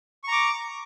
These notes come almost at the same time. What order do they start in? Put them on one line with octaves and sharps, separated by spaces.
C#6 A#5 D6